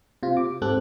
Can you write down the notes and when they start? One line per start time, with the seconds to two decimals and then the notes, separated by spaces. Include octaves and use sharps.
0.23 C3 F4
0.37 D6
0.62 G#2 C4 G4 A4 F#6